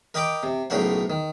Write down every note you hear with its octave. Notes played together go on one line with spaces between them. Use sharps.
A#4 D#5 G5 B5 D6
C3
B1 A2 C#3 A#4 C5 F#5
D#3